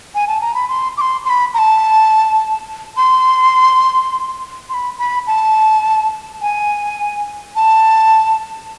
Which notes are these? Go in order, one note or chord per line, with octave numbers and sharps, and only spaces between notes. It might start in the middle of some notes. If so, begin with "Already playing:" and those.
G#5
A5
A#5
B5
C6
D6
C6
C6
B5
A#5
A5
C6
C6
B5
B5
A5
G#5
A5